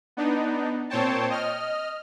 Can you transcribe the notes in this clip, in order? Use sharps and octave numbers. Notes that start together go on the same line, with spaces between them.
B3 D4 D#4
A#2 C4 C5 C#5 G5 A5
D#5 F6